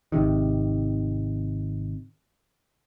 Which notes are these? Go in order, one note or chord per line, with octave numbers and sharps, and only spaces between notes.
G#1 C3 D#3